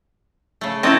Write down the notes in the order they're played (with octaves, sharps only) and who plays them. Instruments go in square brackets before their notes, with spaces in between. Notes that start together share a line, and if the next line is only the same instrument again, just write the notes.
[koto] C#3 A3
[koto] F#3 D#5 A5 [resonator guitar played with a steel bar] C4 C#4 E4